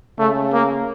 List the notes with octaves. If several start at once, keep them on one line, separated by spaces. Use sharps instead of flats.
C#3 A3
A#3